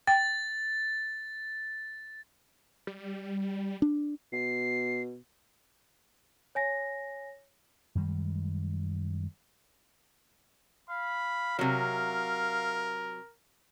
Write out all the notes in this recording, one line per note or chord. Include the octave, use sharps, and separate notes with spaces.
G5 A6
G3
D4
B2 C7
C#5 G#5 A#6
F#2 D#3 G3 G#3
F5 B5
C3 F#3 A#4